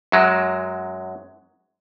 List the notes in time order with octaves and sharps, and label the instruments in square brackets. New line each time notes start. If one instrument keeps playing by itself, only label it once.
[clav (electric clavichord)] F#2 F#3 G#3